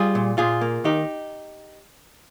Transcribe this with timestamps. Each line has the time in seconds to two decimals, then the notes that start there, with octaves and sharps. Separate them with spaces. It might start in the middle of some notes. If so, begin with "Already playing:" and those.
Already playing: G3 F4 G#4
0.15 A#2
0.38 A#2 F4 G#4
0.61 A#3
0.84 D#3 D#4 G4